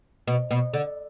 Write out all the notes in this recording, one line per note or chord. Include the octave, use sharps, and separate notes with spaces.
B2
B2
D3